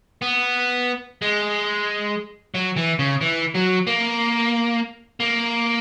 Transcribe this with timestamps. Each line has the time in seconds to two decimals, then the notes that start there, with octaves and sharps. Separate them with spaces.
0.22 B3
1.22 G#3
2.54 F#3
2.77 E3
2.99 C#3
3.21 E3
3.54 F#3
3.87 A#3
5.20 A#3